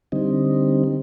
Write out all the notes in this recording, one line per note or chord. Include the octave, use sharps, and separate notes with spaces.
D3 G3 C4 D#4